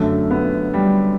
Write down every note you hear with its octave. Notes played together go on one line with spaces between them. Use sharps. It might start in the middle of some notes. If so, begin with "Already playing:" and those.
Already playing: F#2 D3 A3
B3
G3